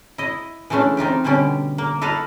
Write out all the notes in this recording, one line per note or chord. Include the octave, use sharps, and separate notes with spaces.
E4 D#5
E3 G#3 A3 C#4 D4
C4 D#4 F4 G4
B2 D3 G3 C#4 G4
A#3
E4 A4 B4 D#5 F5